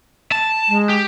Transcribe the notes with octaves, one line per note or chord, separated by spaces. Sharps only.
A5
G#3
G4